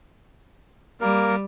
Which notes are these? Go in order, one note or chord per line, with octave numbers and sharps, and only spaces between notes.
G3 A#3 A#4